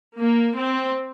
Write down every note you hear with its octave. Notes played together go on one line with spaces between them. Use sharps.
A#3
C4